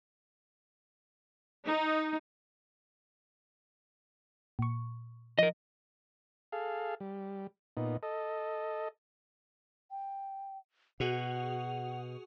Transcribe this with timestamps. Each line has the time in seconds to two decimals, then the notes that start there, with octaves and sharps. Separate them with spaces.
1.65 D#4
4.59 A#2 C#6
5.39 F3 A#4 D#5
6.52 G#4 A4 F5
7.00 G3
7.77 A#2 B3 D#4
8.03 A4 D#5
9.91 G5
11.00 B2 F#4 G#4 F#5 F7